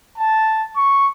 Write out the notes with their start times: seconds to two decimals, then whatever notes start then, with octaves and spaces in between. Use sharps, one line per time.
0.17 A5
0.76 C#6